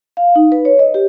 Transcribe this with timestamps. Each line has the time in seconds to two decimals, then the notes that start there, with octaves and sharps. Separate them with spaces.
0.17 F5
0.36 D#4
0.52 B4
0.65 C#5
0.79 D#5
0.94 G4